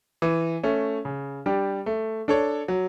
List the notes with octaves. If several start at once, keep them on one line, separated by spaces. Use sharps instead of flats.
E3
A3 C#4
C#3
G3 D4 G4
A3
D4 A4 C#5
F#3